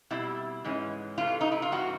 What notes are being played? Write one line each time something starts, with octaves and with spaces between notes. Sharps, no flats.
B2 G3 C4 E4
G#2 E3 G#3 C#4
C3 E3 A3 F4
D#4
E4
F4
G2 E3 C4 F#4